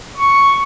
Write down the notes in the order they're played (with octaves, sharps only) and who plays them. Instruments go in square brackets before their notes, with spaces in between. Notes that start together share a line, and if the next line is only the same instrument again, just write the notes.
[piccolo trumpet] C#6